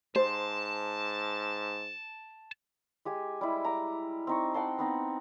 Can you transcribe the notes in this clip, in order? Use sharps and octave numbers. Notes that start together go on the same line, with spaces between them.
G#2 C5 A5
G#3 G4 G#5
G3 G#3 E4
A#5 D6 E6
C4 D#4 C#6
F#5 G5 A5 C6
B3 C4 D#4